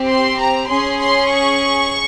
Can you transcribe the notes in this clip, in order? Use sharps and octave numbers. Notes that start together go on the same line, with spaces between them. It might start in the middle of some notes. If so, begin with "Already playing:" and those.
Already playing: C4 G4
C6
A#5
C#4 G#4 C6
C6
C#6